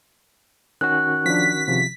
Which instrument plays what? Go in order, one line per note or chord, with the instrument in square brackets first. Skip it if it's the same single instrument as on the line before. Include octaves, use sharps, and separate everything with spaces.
[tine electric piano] D#3 C#4 F#4 [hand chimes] F#6
[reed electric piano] F3 D4 [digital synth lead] B6
[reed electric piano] C3 F3